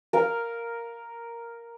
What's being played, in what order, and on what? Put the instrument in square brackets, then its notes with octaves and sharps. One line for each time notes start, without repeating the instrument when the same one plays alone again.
[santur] A#4 F5 A#5